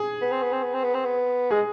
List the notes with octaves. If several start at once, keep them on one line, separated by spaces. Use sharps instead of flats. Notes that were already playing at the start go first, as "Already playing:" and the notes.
Already playing: G#4
B3
C4
B3
C4
B3
C4
B3
C4
B3
G#3 G#4